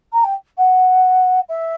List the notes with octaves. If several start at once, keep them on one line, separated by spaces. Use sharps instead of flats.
A#5
G5
F#5
E5